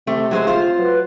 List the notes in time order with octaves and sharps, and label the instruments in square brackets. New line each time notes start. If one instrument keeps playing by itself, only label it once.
[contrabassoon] C3 [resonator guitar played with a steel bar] A3
[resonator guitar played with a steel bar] F#3 G#3 C5
F4 C5
[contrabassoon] F#3 [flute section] B4